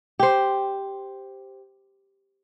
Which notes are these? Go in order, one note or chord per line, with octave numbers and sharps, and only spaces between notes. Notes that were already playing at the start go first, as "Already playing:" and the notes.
G4 C5